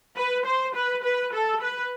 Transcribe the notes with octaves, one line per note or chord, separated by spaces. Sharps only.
B4
C5
B4
B4
A4
B4